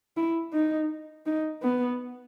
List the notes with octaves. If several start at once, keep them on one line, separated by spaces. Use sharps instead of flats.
E4
D#4
D#4
B3